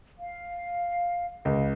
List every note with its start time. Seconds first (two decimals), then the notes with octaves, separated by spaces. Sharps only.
0.20 F5
1.45 C#2